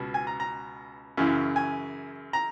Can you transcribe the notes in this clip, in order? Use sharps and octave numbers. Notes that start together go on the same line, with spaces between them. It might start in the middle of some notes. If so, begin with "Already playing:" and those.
Already playing: C#2 B2
G#5
A#5
A#5
F#2 C#3 E3
G#5
A#5